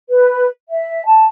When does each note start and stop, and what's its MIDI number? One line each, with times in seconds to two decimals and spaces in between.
0.08 0.44 71
0.68 1.01 76
1.04 1.26 81